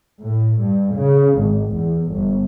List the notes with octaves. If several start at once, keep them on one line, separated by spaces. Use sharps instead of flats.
A2
G2
C#3
G#1
E2
G1